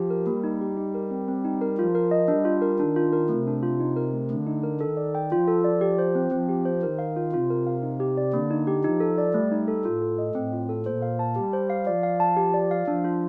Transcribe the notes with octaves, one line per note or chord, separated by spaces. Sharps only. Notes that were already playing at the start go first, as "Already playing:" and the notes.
Already playing: F3 G4
A#4
G3 A#3
D#4
G4
D#4
A#4
C4
C4
D#4
A#4
F3 F4
A#4
D#5
G3 D4
F4
A#4
D#3 D4
F4
A#4
C3 A3
D4
F4
D#4
A#4
A3
D3 A3
D#4
A#4
D#3 A4
D5
G5
F3 F4
A4
D5
G4
C5
C4
F3 C4
G4
C5
D#3 A#4
F5
F4
C3 F4
A#4
F5
D#4
G4
D5
D3 A#3
D#4
G4
F3 D#4
A4
D5
G3 A3
D#4
A4
A2 F4
A4
D#5
A2 C4
F4
A4
A#2 C5
F5
A5
G3 G4
C5
F5
F3 D5
F5
A5
G4
D5
F5
F3 D4
F4